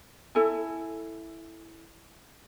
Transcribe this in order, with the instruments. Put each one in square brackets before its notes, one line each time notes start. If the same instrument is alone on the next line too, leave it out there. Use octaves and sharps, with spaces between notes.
[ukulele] E4 A4 G#5